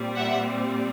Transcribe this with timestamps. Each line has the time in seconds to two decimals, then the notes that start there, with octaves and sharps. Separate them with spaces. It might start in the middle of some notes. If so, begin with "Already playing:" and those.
Already playing: A#2 G3 C4
0.15 E5 F#5